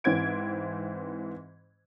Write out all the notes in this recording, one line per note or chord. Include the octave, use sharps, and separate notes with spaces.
G#2 E3 C4 G#6 D7